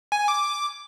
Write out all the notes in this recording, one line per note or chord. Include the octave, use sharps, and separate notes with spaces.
G#5
D6